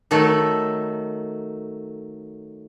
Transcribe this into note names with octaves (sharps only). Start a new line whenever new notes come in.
D#3 F#3 A3 A4